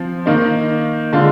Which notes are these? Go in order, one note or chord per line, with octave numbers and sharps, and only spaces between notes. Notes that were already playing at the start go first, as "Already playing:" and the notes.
Already playing: F3 C4
D#3 A#3 D#4
D3 G#3 D4 F4